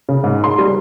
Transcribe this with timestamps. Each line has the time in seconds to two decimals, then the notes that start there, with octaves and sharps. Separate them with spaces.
0.09 C#3
0.24 G#2
0.44 C6
0.58 G3